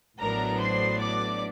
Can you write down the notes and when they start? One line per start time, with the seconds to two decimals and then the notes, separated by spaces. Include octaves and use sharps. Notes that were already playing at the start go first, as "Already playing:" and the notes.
0.19 A1 A2 F#3 B3 D4 A#4 A#5
0.58 C5 C6
0.98 D5 D6